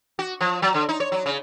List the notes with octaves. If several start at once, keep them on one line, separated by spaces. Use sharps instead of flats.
F#4
F3
F#3
D3
D#4
C#5
F#3
C#3